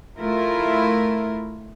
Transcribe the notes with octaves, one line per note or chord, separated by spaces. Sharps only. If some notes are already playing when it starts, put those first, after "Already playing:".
A3 E4 F4 A#4